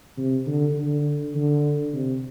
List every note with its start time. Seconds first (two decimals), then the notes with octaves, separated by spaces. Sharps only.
0.17 C3
0.47 D3
0.76 D3
1.35 D3
1.93 C3